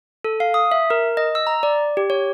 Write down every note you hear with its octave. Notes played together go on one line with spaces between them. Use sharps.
A4
F5
D#6
E5
A#4
D#5
E6
A#5
D5
G4
C#5